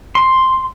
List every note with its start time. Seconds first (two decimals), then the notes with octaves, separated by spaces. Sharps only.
0.15 C6